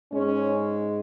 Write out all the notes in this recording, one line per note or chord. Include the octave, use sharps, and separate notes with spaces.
G#2 G#3 C#4